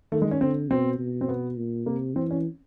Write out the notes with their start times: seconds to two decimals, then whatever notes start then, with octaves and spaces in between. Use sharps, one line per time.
0.12 D#3 A3
0.22 G#3
0.31 C#4
0.41 D3 C4
0.70 B2 C4
0.99 B2
1.21 C4
1.28 B3
1.57 A#2
1.86 C3 A#3
2.16 E3 C4
2.31 C#4